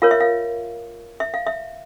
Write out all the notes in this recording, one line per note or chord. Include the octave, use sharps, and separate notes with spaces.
F4 A#4 C#5 F5
E5
F5
E5
F5
E5